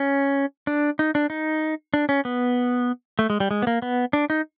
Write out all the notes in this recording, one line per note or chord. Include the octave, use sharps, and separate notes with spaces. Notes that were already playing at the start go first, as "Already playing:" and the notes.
Already playing: C#4
D4
D#4
D4
D#4
D4
C#4
B3
A3
G#3
G3
G#3
B3
A#3
B3
D4
D#4